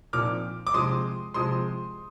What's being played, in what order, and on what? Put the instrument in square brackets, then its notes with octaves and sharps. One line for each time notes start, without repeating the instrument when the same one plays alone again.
[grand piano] A#2 F3 C4 D#4 D6 F6
D6
C3 F3 G#3 C6 D#6
C3 F3 G#3 C6 D#6